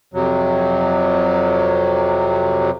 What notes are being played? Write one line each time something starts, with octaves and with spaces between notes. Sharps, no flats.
F2 C3 F#3